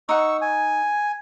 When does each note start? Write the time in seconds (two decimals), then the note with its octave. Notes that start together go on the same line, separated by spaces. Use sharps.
0.09 D#4 F#5 C#6 E6
0.41 G#5